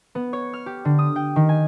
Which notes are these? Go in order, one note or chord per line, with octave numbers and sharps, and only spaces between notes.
B3
C#5
F6
G4
D3
D#6
G5
D#3
G#5